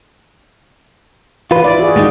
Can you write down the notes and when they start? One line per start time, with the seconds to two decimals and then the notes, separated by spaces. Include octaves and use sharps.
1.51 E3 F4 B4
1.64 E4 D5
1.79 F#4 G#4
1.96 A2 D#3 G#3 D#4